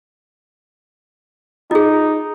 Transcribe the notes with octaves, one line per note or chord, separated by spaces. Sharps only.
D#4 F4 G#4